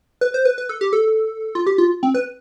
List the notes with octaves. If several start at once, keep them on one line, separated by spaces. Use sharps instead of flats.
B4
C5
B4
B4
A4
G4
A4
F4
G4
F4
C4
B4